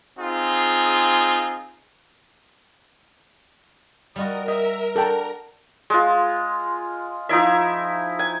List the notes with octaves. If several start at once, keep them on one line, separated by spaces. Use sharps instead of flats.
C4 D#4 F4 G#4
G3 F4 F#4 A#4 D#5
D#5 E5
D4 F#4 A4 G5 A#5
G#3 F4
F3 D#4 E4 E5
G#5